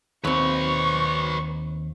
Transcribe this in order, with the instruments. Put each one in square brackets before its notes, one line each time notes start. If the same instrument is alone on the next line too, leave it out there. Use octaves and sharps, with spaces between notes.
[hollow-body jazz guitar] D#2 C4 [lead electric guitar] B4 C#5 [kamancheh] C#6